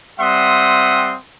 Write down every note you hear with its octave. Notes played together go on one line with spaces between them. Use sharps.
G3 C4 E5 F#5 C6 D#6